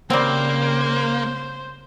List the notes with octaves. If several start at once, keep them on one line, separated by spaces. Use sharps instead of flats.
C#3 G3 A#3 C4 C5